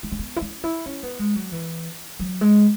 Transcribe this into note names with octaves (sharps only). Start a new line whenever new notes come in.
E4
C#4
B3
E4
C#4
E4
C#4
B3
G#3
F#3
E3
F#3
G#3